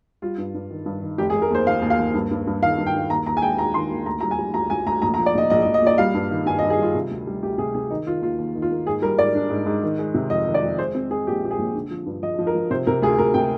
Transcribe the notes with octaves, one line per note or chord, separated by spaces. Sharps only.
G3 F4
G2
G2
D#3
G2
D#3
F1 G4
G#4
F1
A#4
D#2 C5
D#2 F5
D#2
F5
D#2
G2
G2
G2
D#3 F5
G2
G5
G2
D#2 A#5
D#2 A#5
G#5
G#3 G5
D#2 A#5
D#3 C6
D#2
D2 A#5
G3 A#5
G#5
G3
D2 A#5
D2 G#5
D2 A#5
A#1 A#5
A#5
F3
D5
A#1 D#5
A#1 D#5
D#5
A#1
D#5
A#2 D5
G3 F5
G2
D#3
G2 G#5
D#5
G2
G#4
G3 F4
C3
D2
G3
D2 G4
C3 G#4
C3 G#4
D#3 D#4
D#3 F4
D#2 F4
D#2
D#3
F4
A#3
G#2 G#4
G3 A#4
G#2 D5
D4
G#2
G#2
D#3
G#3
C3
F2 D#5
D#3
D5
F2
G#3 C5
C4
C4 G#4
A#1 G4
A#2 G4
G#4
A#1
D3
F3
G2
F3 D#5
F3
A#4
F3
C3 C5
C3 A#4
D2 G#4
D2 A#4
C3 G5